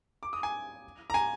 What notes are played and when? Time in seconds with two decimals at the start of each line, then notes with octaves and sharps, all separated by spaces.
0.23 D6
0.33 D#6
0.43 G#5
1.10 A#5
1.14 G#5